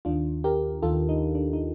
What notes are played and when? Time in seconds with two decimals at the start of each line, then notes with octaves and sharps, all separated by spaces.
0.05 D#2 D#3 D4 F4
0.44 G4 A#4
0.82 D#2 D#3 F4 A4
1.09 D#4
1.35 D4
1.53 D#4